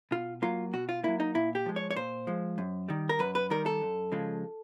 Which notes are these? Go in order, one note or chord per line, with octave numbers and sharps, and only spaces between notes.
B2 F4
F#3 A#3 F4
B2 F#4
F4
F#3 A#3 E4
D#4
A#2 E4
G4
F3 G#3
C#5
C#5
A#2 C5
F3 G#3
F#2
D#3 G3
A#4
F#2 B4
B4
D#3 G3 A#4
A4
F#2
C#3 F3 G#3